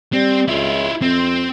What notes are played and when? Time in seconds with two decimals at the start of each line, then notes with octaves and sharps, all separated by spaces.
0.13 G3 C4
0.48 C#2 E4 F4
1.02 F2 C4